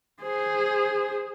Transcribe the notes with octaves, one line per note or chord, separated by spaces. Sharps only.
G#4 C5